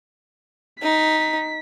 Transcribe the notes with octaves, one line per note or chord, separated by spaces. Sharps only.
D#4 B6